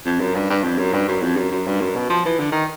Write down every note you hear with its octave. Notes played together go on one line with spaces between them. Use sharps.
F2
F#2
G2
G2
F2
F#2
G2
F#2
F2
F#2
F#2
G2
F#2
B2
F3
E3
D3
D#3